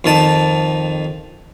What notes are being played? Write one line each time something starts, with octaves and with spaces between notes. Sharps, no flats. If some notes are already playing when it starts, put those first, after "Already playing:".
F2 D#3 A5